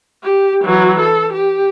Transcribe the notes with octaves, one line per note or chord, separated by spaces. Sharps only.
G4
E3 F#3
A4
G4